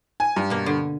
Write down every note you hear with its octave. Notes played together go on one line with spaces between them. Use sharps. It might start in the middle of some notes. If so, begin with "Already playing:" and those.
G#5
G2
B2 A#3
D3